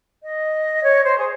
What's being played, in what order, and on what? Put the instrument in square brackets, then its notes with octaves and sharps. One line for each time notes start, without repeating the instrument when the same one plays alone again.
[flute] D#5
C#5
C5
G#4